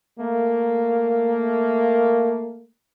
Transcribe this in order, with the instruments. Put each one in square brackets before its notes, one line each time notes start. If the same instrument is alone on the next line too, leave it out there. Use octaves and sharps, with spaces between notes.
[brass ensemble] A3 A#3